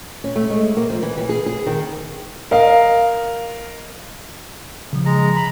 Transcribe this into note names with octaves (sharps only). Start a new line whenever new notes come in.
C#4
A3
G#3
A#3
F3
E3
E3
G#4
G#4
D#3
A#4 D#5 F5
C#3 F3
G#3 A#5
A#5 B5